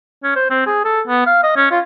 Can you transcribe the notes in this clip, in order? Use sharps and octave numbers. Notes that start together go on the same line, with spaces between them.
C#4
C5
C4
G#4
A4
B3
F5
D#5
C#4
F4